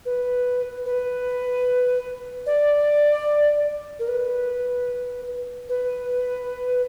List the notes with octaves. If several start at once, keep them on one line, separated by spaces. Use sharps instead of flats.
B4
B4
D5
A#4
B4
B4